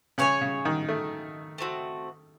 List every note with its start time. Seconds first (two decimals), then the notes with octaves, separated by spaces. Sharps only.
0.18 C#3 G#4 C#5 G#5
0.41 C#3
0.65 D#3
0.89 A3
1.58 A3 C4 F#4